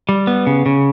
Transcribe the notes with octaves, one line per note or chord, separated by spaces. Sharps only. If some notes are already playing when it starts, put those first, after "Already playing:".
G3
B3
C#3
C#3